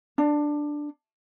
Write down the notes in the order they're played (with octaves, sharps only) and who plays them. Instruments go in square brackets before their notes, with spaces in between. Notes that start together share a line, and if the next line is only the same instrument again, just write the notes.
[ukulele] D4